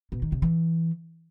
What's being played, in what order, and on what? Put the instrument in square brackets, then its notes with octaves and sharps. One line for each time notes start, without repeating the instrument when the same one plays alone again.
[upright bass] B2
D#3
C3
E3